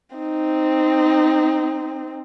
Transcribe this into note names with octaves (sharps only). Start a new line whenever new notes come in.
C4 D#4